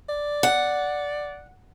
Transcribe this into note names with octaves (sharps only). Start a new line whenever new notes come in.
D5
F#5